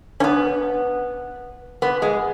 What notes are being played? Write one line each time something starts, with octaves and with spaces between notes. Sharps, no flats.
C#4
B3
B3
G#3